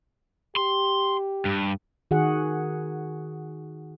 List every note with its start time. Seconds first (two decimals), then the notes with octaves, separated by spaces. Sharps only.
0.56 G4 C6
1.45 G2
2.11 D#3 F#4 G#4 F#5